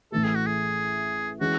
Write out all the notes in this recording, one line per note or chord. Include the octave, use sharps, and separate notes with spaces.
A1 A2 E3 A3 A4
G#4
F#4
G#4
E3 G#3 C#4 E4 F#4